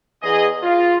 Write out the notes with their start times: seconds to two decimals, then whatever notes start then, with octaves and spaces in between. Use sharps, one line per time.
0.23 E2 G#4 D#5
0.63 F4